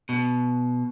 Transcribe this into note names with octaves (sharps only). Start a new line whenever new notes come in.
B2